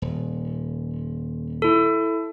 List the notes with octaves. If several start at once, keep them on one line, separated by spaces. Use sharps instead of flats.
D#1
E4 A4